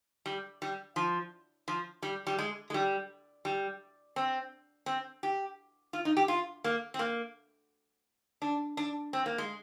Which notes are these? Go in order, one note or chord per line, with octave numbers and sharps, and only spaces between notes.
G3
G3
F3
F3
G3
G3
G#3
G#3
G3
G3
C4
C4
G4
F4
D#4
G4
F4
A#3
C4
A#3
D4
D4
C4
A#3
G#3